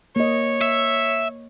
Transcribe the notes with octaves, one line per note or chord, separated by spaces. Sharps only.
A#3 C#5 D#5
E5